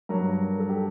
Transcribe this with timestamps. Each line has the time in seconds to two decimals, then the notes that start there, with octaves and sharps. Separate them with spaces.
0.09 G2 F#3 A#4
0.59 A4
0.69 G4